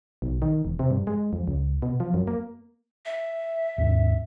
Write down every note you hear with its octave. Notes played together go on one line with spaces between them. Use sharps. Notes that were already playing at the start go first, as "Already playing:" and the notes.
B1
D#3
E1
C3
G2
G#3
F2
C#2
B2
F3
F#2
A#3
E5
D#2 G#2 D4